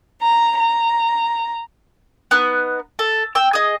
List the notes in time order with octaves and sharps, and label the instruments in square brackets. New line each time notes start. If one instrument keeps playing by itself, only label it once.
[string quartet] A#5
A#5
[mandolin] B3 D#4 F#6
A4
G5 E6
G#4 D#5